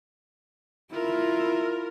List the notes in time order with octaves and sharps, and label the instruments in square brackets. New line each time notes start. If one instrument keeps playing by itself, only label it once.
[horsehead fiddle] E4 [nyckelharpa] F4 [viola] A#4